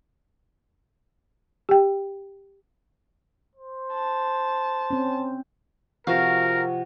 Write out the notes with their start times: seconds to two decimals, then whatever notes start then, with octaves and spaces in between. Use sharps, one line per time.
1.69 G4 G5
3.56 C5
3.94 A5
4.90 C4 C#4
6.07 C3 F3 F#4 A#4 F5 F#5